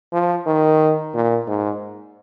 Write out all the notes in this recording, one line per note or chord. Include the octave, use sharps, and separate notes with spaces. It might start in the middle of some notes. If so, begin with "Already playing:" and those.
F3
D#3
A#2
G#2